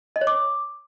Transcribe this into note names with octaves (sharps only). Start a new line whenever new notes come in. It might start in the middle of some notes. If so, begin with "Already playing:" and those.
D#5
C#5
D6